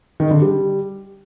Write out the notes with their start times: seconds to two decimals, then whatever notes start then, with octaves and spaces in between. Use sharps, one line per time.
0.20 D#3
0.31 D3
0.42 G3